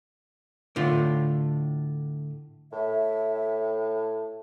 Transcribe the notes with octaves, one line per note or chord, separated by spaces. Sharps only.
A2 D3 F4
A2 E5